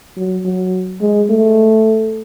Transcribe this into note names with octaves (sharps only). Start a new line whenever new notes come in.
F#3
F#3
G#3
A3